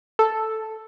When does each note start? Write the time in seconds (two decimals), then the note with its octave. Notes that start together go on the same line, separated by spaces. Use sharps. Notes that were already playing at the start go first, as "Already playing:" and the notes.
0.19 A4